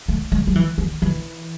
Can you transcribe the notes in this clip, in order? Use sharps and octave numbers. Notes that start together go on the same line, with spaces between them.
A3
G#3
F#3
E3
D#3
E3